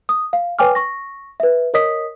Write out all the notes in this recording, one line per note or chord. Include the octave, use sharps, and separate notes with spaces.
D#6
F5
B4 C#5 G5 G#5 D6 F6
C#6 A#6
B4 E5
A#4 C#5 D#5 D#6 B6